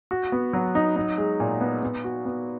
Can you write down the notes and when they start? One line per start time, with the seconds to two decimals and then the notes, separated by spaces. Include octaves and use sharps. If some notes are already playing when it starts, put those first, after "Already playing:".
0.11 F#4
0.32 B3
0.53 F#3
0.75 D#4
0.96 D#4
1.18 G#3
1.40 A#2
1.61 B3
1.83 B3
2.04 F#4
2.25 B3